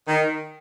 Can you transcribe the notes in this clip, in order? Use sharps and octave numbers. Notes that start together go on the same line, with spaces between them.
D#3